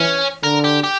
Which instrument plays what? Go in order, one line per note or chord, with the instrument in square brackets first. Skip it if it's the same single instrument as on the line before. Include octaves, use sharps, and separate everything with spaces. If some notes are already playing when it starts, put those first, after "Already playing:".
Already playing: [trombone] E3 [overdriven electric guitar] C#4
[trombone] D3 [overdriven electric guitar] A#4
[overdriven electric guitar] G4
G4